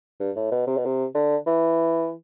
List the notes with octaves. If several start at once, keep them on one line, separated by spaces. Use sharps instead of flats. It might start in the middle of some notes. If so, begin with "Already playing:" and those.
G2
A2
B2
C3
B2
C3
D3
E3